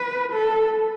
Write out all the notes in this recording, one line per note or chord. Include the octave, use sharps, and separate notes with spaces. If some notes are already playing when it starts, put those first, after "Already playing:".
Already playing: B4
A4